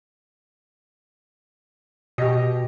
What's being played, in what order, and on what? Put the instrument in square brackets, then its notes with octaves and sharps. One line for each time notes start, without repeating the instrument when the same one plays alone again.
[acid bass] B2 [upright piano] G4 D#5